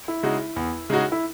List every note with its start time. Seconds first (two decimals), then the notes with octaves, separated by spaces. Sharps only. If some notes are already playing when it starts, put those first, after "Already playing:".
0.08 E4
0.23 C#3 G#3 D#4 F#4
0.56 E2
0.90 C#3 G#3 D#4 F#4
1.12 E4